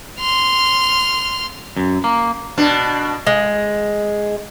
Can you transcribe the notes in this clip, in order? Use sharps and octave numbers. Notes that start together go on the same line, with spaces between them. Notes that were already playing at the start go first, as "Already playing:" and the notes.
C6 F6
F#2
A#3
B2 D4
G#3